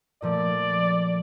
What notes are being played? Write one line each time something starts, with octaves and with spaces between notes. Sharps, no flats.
A#2 F3 A3 D5